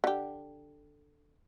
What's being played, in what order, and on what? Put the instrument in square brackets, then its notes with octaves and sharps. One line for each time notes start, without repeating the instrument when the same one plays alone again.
[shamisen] D3 G4